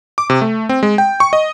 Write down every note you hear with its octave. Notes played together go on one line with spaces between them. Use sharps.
D6
C3
A3
C4
G#3
G5
C#6
D#5